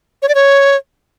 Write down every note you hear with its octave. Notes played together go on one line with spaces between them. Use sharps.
C#5
D5
C#5